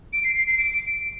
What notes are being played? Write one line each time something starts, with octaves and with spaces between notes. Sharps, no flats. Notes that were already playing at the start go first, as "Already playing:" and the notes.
D7
C7
C7
C7
D7